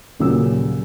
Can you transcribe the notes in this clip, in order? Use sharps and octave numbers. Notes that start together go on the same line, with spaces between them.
D#1 A#2 C#3 F#3 A#3 E6